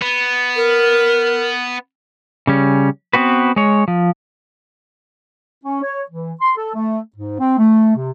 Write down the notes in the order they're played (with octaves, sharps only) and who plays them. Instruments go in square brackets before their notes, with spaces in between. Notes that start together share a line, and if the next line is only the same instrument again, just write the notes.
[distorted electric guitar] B3
[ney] A#4
[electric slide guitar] C#3 G3 C#4
B3 C4 F#4 B4
G#3 C#5
F3
[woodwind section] C#4
C#5
E3
C6
A4
A3
G#2
C4
A3
C3